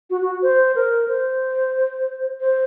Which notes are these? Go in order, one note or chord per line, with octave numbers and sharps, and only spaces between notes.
F#4
F#4
C5
A#4
C5
C5